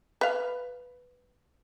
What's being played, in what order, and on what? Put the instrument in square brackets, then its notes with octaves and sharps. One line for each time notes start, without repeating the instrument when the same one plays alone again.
[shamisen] B4 F5